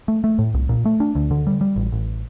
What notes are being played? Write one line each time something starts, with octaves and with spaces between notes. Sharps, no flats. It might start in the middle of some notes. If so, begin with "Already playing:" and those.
A3
A3
A2
C2
A#2
A3
D4
D2
D3
G3
G3
A1
A1